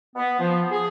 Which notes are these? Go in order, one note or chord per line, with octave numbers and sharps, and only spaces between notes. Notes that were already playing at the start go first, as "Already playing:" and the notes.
B3
F3
G#4